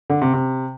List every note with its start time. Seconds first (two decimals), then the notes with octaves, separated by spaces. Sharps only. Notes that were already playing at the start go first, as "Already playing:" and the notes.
0.10 D3
0.22 C3
0.33 C3